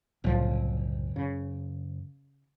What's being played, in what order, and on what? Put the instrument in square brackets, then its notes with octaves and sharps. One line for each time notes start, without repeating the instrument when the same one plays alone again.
[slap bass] F#1 [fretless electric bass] C2 A2 F3
[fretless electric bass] C#3